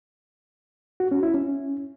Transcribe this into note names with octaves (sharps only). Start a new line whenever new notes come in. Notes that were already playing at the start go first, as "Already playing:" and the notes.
F#4
C#4
E4
C#4